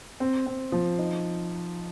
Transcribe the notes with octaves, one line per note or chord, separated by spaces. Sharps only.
C4
C4
F3
D#4